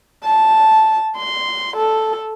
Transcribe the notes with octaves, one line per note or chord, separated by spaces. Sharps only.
A5
C6
A4